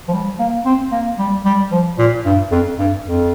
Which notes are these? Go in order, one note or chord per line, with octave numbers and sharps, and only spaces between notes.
F3
G3
A#3
C4
A#3
G3
G3
F3
A#2
G2
F2
G2
F2